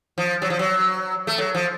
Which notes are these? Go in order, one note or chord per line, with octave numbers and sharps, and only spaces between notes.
F3
F#3
F3
F#3
A3
F#3
F3